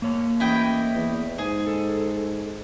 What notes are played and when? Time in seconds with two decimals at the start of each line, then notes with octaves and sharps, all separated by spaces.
0.02 A#3 C#5
0.40 A1 E4 D#5 G5
0.95 E2
1.38 G#2 G#4
1.67 A4